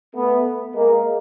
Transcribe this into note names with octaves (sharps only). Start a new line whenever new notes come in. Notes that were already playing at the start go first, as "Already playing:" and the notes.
A3 B3
G#3 A#3